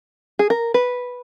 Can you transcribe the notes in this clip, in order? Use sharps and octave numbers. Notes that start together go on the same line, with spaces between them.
G#4
A#4
B4